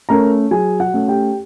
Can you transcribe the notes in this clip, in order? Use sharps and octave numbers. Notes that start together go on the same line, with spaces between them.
A3 C#4 A#4 A#5
F#3 G#4 G#5
F#4 F#5
A3 C#4
G4 G5